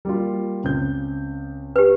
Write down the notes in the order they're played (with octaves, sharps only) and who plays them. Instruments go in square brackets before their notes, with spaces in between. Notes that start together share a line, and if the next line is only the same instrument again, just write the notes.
[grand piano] G3 A#3 F4
C#2 C4 G6
[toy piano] G4 B4